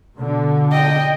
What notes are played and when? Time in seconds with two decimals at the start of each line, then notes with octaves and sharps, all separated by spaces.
0.15 B2 D3
0.72 D#5 G5